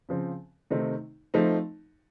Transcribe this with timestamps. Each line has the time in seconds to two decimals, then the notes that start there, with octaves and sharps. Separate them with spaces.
0.09 C#3 F3 C4
0.71 C3 D#3 A3 C4 D#4
1.34 F3 A3 C4 D#4